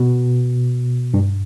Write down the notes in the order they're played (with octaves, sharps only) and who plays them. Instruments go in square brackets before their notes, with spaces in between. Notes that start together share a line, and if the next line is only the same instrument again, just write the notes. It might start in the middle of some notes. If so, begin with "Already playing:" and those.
Already playing: [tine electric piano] B2
G2